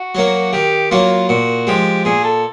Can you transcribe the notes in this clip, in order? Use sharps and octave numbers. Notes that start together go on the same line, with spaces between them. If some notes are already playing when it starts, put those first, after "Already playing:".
Already playing: F#4
F#3 A#3
D#3 G4
F#3 A#3 F4
A#2 F#4
F3 G#3 G4
A#2 G#4
A4